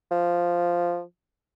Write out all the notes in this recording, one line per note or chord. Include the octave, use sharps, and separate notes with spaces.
F3